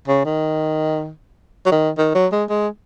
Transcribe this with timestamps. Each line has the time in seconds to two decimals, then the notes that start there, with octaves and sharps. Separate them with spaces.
0.08 C#3
0.25 D#3
1.66 F#3
1.72 D#3
1.98 D#3
2.15 F#3
2.32 G#3
2.50 G#3